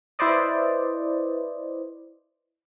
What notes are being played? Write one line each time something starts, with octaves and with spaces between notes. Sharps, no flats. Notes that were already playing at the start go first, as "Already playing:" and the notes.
E4 B4 C5 D5 D#5